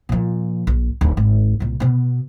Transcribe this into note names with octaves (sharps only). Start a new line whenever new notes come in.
A#2 F3
A#1
D1
G#1
C2 A#2
B2 B3